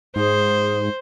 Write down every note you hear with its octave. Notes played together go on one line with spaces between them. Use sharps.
G#2 G#4 C5